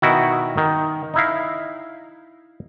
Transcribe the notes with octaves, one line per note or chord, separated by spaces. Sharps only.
B2 D#3 E4 F#4
D#3
D#4 E4 F5